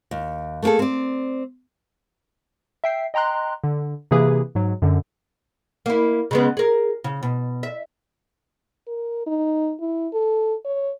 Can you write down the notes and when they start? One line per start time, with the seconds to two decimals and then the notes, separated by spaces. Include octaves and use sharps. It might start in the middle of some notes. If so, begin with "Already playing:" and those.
0.11 D#2
0.62 A3 A#3 D#4 G#4 A4
0.79 C4 D5
2.84 E5 G5 C7
3.14 D#5 G5 A#5 C6 F#6
3.64 D3
4.11 C3 E3 A#3 G#4 B4
4.55 G#2 F#3
4.82 F#2 D3
5.86 A#3 E4
6.31 C#3 G#3 B3
6.57 G#4 A#4
7.04 C#3
7.23 B2
7.63 E5
8.87 A#4
9.27 D#4
9.80 E4
10.13 A4
10.65 C#5